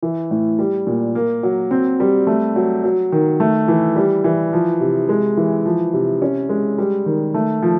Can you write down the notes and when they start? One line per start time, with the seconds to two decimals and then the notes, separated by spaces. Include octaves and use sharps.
0.03 E3
0.31 A2
0.59 G3
0.87 A#2
1.15 A#3
1.43 F#3
1.71 C4
2.00 G3
2.27 A3
2.56 F#3
2.84 F#3
3.12 D#3
3.40 A3
3.68 E3
3.96 G3
4.24 E3
4.53 F3
4.81 C3
5.09 G#3
5.37 E3
5.66 F3
5.93 C3
6.22 C#4
6.49 G#3
6.78 G3
7.06 D#3
7.34 A3
7.62 F3